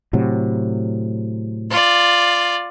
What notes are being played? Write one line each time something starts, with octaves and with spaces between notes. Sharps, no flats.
A2 C3 F#3
F4 D5